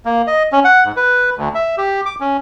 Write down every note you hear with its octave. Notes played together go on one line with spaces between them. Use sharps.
A#3
D#5
C#4
F#5
G#2
B4
D2
E5
G4
D6
C#4